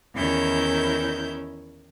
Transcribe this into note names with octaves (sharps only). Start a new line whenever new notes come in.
E2 D#3 C#4 E4 A#4 G6